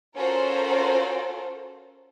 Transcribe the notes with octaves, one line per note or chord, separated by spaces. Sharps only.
C#4 F4 F#4 A4 A#4 C5